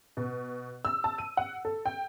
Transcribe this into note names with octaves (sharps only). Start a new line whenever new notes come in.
B2
E6
A5
D#7
F#5
A4
G5